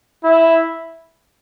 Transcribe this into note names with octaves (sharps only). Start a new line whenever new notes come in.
E4